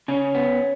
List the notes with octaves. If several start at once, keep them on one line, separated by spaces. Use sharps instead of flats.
C#3 C#4
B3